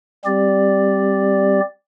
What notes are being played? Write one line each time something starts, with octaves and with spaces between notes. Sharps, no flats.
G3 C4 G4 D5